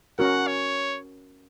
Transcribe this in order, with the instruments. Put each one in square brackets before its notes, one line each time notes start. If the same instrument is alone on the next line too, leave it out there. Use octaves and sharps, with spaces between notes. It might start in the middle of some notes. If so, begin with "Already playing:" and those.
[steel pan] C#4 F#4 A#4 [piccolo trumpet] F#5
[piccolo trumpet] C#5